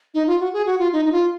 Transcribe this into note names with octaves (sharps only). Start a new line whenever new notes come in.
D#4
F4
F#4
G#4
F#4
F4
D#4
D#4
F4